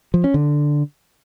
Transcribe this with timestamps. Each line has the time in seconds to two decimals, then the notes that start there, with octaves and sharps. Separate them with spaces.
0.14 F3
0.24 C#4
0.34 D3